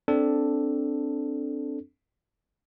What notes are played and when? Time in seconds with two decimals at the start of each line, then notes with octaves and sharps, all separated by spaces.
0.08 C4 D4 A4